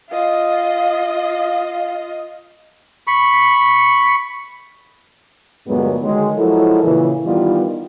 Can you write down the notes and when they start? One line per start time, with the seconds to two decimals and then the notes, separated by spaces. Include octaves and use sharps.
0.10 F4 D#5 F5
3.07 B5 C#6
5.67 D2 G2 A#2 F#3 G#3 B3
6.02 D3 D#3 F#3 G#3
6.37 F3 F#3 G#3 E4 A4 A#4
6.84 A#2 C#3 E3
7.25 D#3 E3 G3 B3 D#4 F4